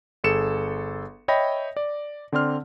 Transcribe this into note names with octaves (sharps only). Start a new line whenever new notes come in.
G1 G#4 A4 C#7 E7
C#5 D#5 E5 G5 B5 A#6
D5
D3 C4 D5 C6 F6